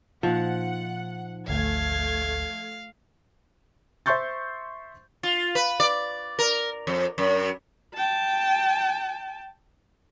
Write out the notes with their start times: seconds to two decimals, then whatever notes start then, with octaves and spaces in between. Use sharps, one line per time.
0.23 A#2 F3 D#4 F#5
1.48 G#1 D2 A3 F5 G#6
4.06 C5 E5 C6 C#6 G6 A6
5.23 F4
5.55 B4
5.80 D5
6.39 A#4
6.87 F2
7.18 F#2
7.94 G5 A5